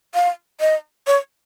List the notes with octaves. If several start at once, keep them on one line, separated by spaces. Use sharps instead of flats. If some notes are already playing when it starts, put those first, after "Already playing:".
F5
D#5
C#5